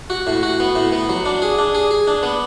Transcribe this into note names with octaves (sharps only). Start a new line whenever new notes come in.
F#4
A2
F#4
B3
A2
B3
F#3
D4
G#4
D4
G#4
G#4
D4
B3